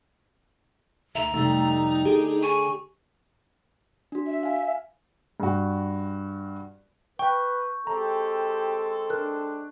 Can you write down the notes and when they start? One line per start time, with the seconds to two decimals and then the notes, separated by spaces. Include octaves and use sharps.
1.15 D2 E5 A#5
1.34 F2 C3 G3 A3 D#4
2.05 D3 G4 G#4
2.43 G#5 C#6
4.12 D4 F#4
4.27 E5
4.43 F5 G#5
5.40 G2 F#4
7.19 B4 G5 C#6 G6
7.87 G#3 C4 G4 A4 A#5
9.10 D4 A#4 F#6